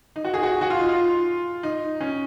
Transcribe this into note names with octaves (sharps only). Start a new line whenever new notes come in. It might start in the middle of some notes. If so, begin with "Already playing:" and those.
D#4
F#4
G#4
F#4
F#4
F4
D#4
F4
D#4
C#4